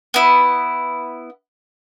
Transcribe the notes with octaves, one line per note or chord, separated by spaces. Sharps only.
B3 E4